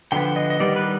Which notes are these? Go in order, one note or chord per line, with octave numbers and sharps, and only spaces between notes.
D3 F3 B3 G5
D#5
D#5
D#3 G3 B3 D5
B4